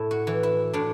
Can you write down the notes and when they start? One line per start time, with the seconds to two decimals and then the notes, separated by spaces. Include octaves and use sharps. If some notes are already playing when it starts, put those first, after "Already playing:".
Already playing: A2 E4
0.11 F#4
0.27 E3
0.43 E4
0.73 A2 D4